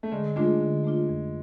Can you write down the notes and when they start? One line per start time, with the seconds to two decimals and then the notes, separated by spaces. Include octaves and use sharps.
0.03 A3
0.12 D3 G#3
0.36 G#3 A3 D4 F4
0.61 D3
0.84 A3 D4 F4
1.09 F2